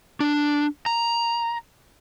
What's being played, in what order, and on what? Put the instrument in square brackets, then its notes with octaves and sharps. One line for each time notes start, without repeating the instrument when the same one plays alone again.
[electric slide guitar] D4
A#5